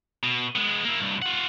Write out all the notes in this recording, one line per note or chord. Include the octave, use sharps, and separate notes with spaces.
B2
G#3 B3
A#3 E4
C2 G2
F4 F#5